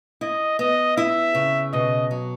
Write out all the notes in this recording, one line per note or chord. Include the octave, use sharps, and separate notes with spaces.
E4 D#5
B3 D#5
E4 E5
C#3
B2 D#5
F#3